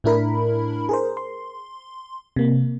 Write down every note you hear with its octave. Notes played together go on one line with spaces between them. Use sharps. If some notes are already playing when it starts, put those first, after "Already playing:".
A2 A3 D4 E4 A#4 B5
G#4 A#4 C5
C6
C3 A#3